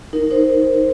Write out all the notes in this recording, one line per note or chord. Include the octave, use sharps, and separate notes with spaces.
D#4 A#4
D#4 C5